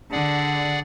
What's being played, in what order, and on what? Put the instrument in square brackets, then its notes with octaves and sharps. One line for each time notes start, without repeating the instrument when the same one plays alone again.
[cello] D3 [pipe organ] G#4 D5 F#5